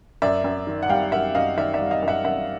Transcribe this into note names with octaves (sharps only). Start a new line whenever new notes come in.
F#2 D5 E5
F#2
D#3
F#5
G3 F5 G5
F#2 E5 F#5
F#2 D#5 F5
D#3 D5 E5
D5 E5
G3
D#5 F5
F#2
E5 F#5
F#2 E5 F#5